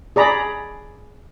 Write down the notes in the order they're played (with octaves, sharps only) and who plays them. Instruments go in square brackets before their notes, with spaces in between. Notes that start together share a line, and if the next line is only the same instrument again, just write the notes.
[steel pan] G#4 D5 A#5 B5